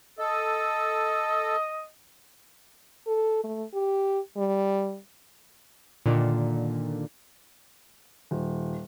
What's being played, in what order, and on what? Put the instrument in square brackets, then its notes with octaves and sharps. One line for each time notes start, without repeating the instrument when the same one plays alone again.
[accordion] A4 [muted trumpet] D#5
[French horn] A4
A3
G4
G3
[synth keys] A#2 D3 D#3
[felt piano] D#1